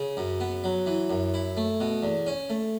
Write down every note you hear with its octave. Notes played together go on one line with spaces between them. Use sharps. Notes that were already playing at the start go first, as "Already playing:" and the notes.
Already playing: C#3
F#2
B3
F#3
E3
F#2
E4
A3
B2
E2
C#4
A3